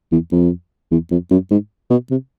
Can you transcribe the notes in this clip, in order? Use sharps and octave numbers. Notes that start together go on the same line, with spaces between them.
E2
F2
E2
F2
F#2
G#2
B2
C3